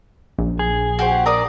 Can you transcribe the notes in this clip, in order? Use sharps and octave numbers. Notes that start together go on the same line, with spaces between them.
A#1
G#4
F#4 G4 C5
A#4 D5 D#6